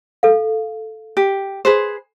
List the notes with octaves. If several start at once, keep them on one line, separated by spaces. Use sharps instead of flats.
A4 F5
G4
G#4 B4 C5